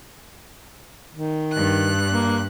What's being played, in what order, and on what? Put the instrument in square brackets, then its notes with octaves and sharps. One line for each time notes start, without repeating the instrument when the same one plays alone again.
[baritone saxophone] D#3
[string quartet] G2 F#6
[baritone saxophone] A#3